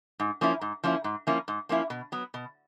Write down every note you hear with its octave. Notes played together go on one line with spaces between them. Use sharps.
G#2
F3 A#3 C#4 E4
G#2
F3 A#3 C#4 E4
G#2
F3 A#3 C#4 E4
G#2
F3 A#3 C#4 E4
B2
F#3 B3
B2